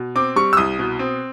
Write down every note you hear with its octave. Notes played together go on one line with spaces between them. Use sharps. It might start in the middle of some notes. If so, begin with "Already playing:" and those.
Already playing: B2
C4 D6
G3 C#6
E6
C2 D#6
B2
C4